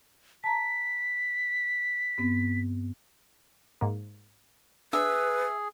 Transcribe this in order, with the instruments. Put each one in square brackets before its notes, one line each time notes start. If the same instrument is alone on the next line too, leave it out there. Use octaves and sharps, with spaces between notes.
[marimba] A5 A#5 [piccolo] B6
[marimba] G2 B3 C4
[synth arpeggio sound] G#2 A#3
[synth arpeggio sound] D4 E6 [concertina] G#4 [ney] B4 [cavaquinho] E5